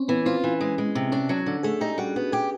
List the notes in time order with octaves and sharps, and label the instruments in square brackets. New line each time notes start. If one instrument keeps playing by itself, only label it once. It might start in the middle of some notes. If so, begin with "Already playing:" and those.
Already playing: [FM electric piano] C4 C#4
[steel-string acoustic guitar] E3 [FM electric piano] B3
[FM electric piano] C4 [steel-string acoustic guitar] F4
[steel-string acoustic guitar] E3
G#3
G#3
C3
[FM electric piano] C#4 [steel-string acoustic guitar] D4
[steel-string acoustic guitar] F#3 [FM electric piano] C#4
[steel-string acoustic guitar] D3 [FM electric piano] D4
[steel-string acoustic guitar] A3 [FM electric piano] G#4
[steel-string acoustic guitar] D#4 [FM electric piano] G4
[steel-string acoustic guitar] G3 [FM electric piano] F#4
[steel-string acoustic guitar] B3 [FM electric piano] F#4
[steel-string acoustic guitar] G4 [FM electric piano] G#4